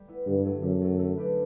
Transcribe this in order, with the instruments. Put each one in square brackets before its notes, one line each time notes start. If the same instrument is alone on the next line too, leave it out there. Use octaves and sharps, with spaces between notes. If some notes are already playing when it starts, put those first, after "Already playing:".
Already playing: [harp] G3 A3
B3 E4 B4
[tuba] G2 [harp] D3
[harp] F#3 A3
[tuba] F#2 [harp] D3
[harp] F#3 A3
A3
D4 G4 B4